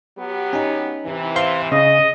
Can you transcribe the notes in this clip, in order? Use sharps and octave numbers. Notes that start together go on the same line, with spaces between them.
F#3 B3 G4
C#4 D#4
C3 E3
C5 F5 C6
C#3 C#4 D#5